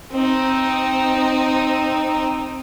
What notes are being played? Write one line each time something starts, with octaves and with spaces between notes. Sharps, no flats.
C4 D#4